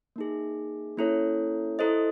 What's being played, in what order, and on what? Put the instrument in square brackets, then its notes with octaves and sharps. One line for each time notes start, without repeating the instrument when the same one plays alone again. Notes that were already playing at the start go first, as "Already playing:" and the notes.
[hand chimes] A#3 D#4 G#4
A#3 C#4 E4 A4 C#5
E4 A4 C5 D#5